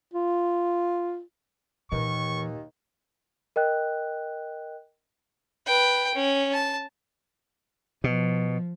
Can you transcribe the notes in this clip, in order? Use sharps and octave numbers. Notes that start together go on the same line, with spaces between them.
F4
D#2 A#2 D#3 E3 C#6
A#4 D#5 G5 F#6
B4 G5
C#4
A5
B2 F3